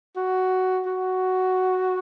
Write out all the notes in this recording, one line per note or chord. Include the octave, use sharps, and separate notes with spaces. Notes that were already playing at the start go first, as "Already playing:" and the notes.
F#4
F#4